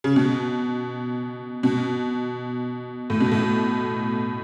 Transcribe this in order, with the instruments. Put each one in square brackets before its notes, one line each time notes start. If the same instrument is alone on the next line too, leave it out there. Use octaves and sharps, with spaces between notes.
[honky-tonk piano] C#3
B2
B2
A2
B2
A2